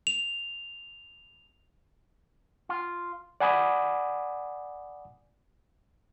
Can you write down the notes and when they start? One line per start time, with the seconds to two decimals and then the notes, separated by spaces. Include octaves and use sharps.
0.07 F7
2.69 F4
3.40 D5 F#5 G#5 B5 D6 D#6